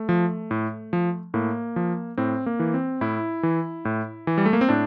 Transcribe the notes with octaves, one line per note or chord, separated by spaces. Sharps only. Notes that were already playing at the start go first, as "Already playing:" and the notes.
Already playing: A3
F3
A2
F3
A2 A#3
F3
A2 C4
A#3
E3
C4
A2 E4
E3
A2
E3
G3
A3
A#3
C4
A2 D4